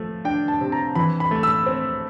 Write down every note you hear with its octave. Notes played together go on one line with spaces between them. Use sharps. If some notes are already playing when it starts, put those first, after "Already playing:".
Already playing: F3 A3
D4 G5
A5
C3
A#5
E3 B5
B5
A3
E6
C4